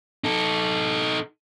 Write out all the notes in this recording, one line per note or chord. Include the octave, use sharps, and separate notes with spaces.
D#4 A4